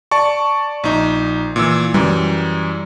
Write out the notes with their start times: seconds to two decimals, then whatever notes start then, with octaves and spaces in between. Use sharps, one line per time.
0.11 D5 A5 C#6
0.84 A#1 D#4
1.56 A#2 E3 E6
1.94 F#2 E3 G3